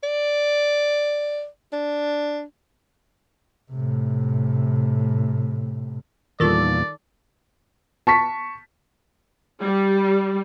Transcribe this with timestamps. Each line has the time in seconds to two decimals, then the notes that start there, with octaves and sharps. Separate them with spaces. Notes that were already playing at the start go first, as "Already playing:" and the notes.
0.03 D5
1.73 D4
3.72 A2 C3
6.40 E2 A#2 D#3 G3 F4 A4 D5 D6
8.07 A5 C#6 B6
9.60 G3